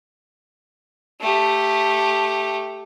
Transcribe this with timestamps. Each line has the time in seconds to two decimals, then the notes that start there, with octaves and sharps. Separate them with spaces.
1.21 A3 G4